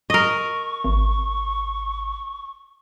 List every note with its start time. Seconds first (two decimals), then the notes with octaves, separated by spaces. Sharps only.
0.10 A#4 D#5 C#6
0.84 G#1